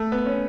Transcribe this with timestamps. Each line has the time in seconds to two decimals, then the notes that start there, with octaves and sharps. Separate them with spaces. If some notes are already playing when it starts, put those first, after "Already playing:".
Already playing: A3
0.12 B3
0.26 C#4